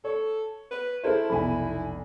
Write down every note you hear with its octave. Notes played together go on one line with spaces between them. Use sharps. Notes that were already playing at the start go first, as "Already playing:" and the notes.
A4 C#5
B4
E4 A4 A#4 C5
F1 B1 G#5 B5